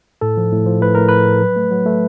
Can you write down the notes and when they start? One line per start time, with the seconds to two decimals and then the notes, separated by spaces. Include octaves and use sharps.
0.21 A2 A4
0.37 F3
0.52 A2
0.66 F3
0.81 A2 B4
0.95 A2 A#4
1.08 A2 B4
1.26 A2
1.42 F#3
1.56 A3
1.71 F#3
1.86 A3